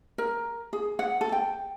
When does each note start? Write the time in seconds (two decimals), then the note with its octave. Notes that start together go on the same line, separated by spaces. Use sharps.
0.18 A#4
0.73 G#4
0.99 F#5
1.21 A4
1.32 G5